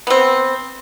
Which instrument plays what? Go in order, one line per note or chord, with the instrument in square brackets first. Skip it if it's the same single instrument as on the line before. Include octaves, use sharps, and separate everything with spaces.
[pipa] B3 C4